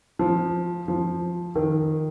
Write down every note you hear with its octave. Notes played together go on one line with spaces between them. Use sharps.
F3
F3
D#3